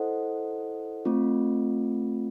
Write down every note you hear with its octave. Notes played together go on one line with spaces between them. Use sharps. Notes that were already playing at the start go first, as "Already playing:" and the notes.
Already playing: E4 A4 C5 D#5 F#5
A3 C4 F4